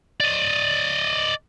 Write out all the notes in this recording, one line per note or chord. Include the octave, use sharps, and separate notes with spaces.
D5 D#5